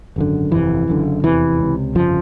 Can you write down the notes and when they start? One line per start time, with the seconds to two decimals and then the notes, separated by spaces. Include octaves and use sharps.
0.16 G#1 F#2 D3
0.52 G1 F2 C3 E3
0.88 F#1 F#2 D3
1.24 F1 E2 C3 E3
1.59 C#2 C3
1.95 G1 F2 C#3 F3